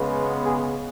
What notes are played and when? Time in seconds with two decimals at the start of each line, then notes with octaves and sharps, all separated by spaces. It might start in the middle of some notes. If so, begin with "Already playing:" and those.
Already playing: C#3 G#3 B3
0.45 G#4